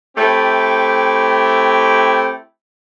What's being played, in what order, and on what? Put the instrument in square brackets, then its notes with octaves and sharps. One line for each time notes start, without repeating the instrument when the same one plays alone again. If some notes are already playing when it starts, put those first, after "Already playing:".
[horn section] A3 C4 E4 G4 G5